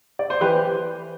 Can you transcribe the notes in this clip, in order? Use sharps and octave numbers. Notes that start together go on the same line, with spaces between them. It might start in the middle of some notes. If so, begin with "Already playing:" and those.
D5
C5
E3 G4 B4